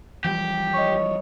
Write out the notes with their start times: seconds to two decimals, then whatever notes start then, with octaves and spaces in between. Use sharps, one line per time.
0.24 E3 F3 G3 G4
0.74 C#5 D#5 C#6